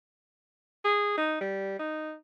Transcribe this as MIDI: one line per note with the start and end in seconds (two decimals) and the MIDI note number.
0.84 1.13 68
1.17 1.38 63
1.41 1.76 55
1.79 2.13 63